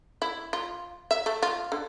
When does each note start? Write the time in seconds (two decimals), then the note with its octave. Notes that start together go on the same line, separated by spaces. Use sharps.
0.22 E4
0.53 F4
1.11 E5
1.26 A3
1.43 F4
1.72 D3